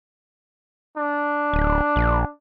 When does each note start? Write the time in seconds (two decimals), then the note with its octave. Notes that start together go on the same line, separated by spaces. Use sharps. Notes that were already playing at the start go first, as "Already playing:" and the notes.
0.97 D4
1.54 D1
1.96 A#1